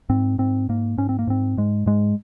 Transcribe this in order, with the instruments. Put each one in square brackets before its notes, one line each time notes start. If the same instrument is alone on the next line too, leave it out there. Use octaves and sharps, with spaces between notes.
[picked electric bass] G#2 C4
G#2 C4
G#2 A#3
G#2 C#4
C4
A#3
G#2 C4
G#2 G#3
G#2 G#3